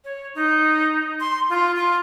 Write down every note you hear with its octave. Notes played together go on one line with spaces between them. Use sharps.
C#5
D#4
C6
F4
F4